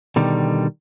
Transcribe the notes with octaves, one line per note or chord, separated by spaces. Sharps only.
B2 D3 D#3 G3